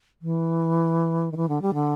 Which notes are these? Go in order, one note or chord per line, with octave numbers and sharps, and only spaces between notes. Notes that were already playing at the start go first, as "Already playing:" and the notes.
E3
D#3
E3
D3
G3
D3